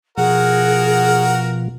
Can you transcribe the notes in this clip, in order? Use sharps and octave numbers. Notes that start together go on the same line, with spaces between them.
B2 F3 F#4 G#4 A#4 F#5